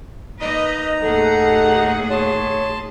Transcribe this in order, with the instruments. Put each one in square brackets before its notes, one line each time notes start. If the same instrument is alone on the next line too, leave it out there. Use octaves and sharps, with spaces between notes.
[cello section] A#3 B4 D#5 [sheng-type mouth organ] D#4 A#5
[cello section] D#2 A2 G#4 [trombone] A4 [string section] F#5
[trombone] C#5 [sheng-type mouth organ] A5 C6